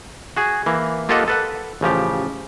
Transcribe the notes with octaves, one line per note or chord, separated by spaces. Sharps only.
F#4 G#4
E3 A#3
A#3 F4 G4 A4 D#5 F#5
A4 B4 F#5
A1 C#3 F3 G4